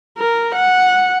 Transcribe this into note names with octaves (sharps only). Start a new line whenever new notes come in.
A#4
F#5